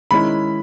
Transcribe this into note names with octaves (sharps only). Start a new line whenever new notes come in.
D#3 G#3 C#4 E4 B5